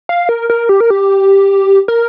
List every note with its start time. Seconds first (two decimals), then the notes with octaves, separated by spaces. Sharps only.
0.09 F5
0.29 A#4
0.50 A#4
0.69 G4
0.80 A#4
0.90 G4
1.88 A#4